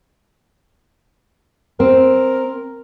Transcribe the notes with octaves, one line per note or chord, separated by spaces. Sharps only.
C4 A#4